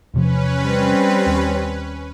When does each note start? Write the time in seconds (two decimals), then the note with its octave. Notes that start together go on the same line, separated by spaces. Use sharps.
0.14 E2 C3 F3 C#4 B4
0.63 G3 C4
1.26 D#2